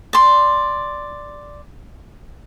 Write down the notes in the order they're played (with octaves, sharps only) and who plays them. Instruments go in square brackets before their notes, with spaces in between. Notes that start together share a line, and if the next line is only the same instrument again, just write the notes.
[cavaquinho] D5 C6